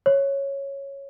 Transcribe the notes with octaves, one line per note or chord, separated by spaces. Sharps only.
C#5